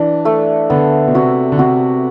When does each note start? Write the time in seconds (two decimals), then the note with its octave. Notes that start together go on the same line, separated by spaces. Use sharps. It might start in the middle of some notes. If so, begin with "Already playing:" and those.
Already playing: E3 D4
0.25 A3
0.70 D3 B3
1.07 B2
1.14 C3 F#4
1.52 D3
1.59 C3 F#4